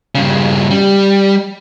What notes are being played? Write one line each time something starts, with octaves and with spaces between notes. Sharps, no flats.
G2 C#3
G3